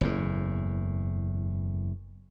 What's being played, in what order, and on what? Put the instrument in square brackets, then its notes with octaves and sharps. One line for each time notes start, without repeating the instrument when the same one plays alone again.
[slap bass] F#1 E2 A2